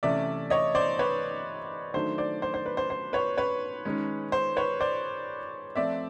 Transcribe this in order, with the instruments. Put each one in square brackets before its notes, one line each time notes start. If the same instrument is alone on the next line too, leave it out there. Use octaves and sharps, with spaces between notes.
[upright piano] C3 E3 A3 C#4 D5 E5
C#5 D#5
C5 D5
B4 C#5
D#3 F#3 A3 D4 C5
C5 D5
C5
C5
B4
C5
C5
B4 C#5
B4 C#5
D#3 G#3 C#4
C5
B4 C#5
C5 D5
F3 A3 C4 D5 E5